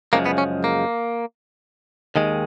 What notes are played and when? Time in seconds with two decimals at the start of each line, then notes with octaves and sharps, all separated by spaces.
0.13 F#2 C#3 F3 G#3 A#3
0.26 B3
0.38 C#4
0.64 A#3
2.16 D#2 D#3 G#3